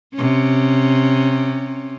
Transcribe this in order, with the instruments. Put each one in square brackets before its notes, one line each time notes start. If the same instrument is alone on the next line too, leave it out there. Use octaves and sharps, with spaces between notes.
[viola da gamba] C3 C#4